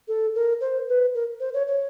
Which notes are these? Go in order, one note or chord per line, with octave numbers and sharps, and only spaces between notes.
A4
A#4
C5
B4
A#4
C5
C#5
C#5